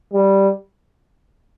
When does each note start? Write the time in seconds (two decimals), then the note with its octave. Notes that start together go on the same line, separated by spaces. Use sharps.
0.14 G3